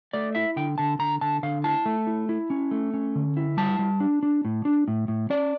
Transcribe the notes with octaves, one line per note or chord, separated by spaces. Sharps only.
A3 D5
E4 E5
D3 G5
D3 A5
D3 A#5
D3 A5
D3 F5
E4 A5
A3
E4
E4
C#4
A3
C#4
D3
E4
G3 A5
G3
D4
D4
A2
D4
A2
A2
C#4 D5